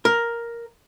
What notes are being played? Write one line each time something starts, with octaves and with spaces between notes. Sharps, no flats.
A#4